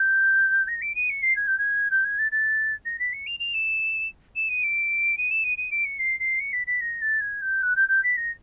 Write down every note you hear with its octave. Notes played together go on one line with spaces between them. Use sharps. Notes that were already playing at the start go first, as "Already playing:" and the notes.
Already playing: G6
A#6
D7
D#7
C#7
C7
G#6
G6
G#6
G6
G#6
A6
A6
A#6
B6
C#7
F7
F7
E7
E7
D#7
D7
D#7
E7
D#7
D#7
D7
C#7
C7
C7
C#7
B6
B6
A#6
A6
G#6
G6
F#6
G6
G6
B6
A#6